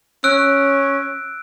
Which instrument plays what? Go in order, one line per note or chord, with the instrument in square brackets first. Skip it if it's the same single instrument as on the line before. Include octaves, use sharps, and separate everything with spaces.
[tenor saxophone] C#4 [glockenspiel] E6 F#6 D7